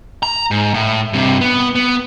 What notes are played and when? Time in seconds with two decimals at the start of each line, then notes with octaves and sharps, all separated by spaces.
0.23 A#5
0.51 G#2
0.74 A2
1.13 G2 C3
1.41 B3
1.75 B3